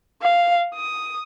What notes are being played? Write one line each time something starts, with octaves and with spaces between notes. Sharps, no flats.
F5
D#6